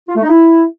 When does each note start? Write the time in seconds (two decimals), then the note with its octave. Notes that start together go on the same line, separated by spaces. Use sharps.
0.08 F4
0.15 A3
0.23 D#4
0.30 E4